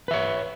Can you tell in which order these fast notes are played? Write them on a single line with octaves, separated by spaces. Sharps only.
B4 E5 C#5